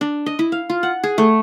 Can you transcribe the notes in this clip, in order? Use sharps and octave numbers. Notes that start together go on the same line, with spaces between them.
D4
D#5
E4
F5
F4
F#5
G#4
A3